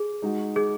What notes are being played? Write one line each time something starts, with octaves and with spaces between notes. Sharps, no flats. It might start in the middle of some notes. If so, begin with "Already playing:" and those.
Already playing: G#4
G#3 D#4 F#4
G#4